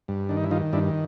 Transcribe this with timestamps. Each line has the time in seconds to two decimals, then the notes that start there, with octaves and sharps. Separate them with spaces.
0.08 G2
0.29 D#3 D4
0.37 D#4
0.44 E4
0.51 D#3 D#4 F4
0.73 G2 D4 E4